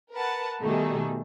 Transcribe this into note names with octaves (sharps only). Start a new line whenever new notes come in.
A#4 B4 F#5 A5
B2 D#3 G3 A3 D#4 G#4